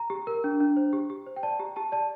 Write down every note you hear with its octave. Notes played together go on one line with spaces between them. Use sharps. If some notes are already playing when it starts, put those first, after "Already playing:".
Already playing: A#5
G4
A#4
D4
D4
C5
G4
G4
C5
G5
D5 A5
G4 A#5
G4 A5
D5 A5